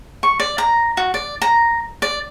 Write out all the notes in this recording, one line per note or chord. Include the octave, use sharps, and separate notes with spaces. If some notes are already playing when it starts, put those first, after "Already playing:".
C#6
D5
A#5
F#4
D5
A#5
D5